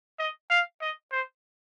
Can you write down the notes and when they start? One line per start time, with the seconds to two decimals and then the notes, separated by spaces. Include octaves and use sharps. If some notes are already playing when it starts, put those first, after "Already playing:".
0.19 D#5
0.50 F5
0.81 D#5
1.12 C5